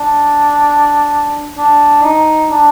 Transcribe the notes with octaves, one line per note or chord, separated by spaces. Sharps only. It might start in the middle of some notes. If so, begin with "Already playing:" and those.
Already playing: D4
D4
D#4
D4